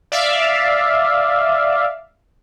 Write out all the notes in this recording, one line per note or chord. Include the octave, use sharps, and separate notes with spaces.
D5 E5 F5